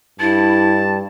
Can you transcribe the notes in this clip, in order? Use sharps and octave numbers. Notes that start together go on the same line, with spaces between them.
G2 E4 A5